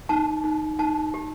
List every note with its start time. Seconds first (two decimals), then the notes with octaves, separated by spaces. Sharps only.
0.09 D#4 A5
0.44 D#4
0.79 D#4 A5
1.14 G4